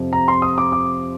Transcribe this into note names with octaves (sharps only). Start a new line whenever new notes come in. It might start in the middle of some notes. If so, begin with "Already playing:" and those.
Already playing: F2 C3 F3
A#5
C6
D#6
D6
D6